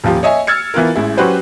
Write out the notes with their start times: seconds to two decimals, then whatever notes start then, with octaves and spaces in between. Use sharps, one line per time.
0.04 D#1 F3 G4
0.23 C#5 D#5 E5 G#5
0.47 E6 F6 G#6 A6 C#7
0.74 E3 B3 F4 A#4
0.95 A1 G#3 E4
1.17 F#3 C#4 F#4 G4 B4 C5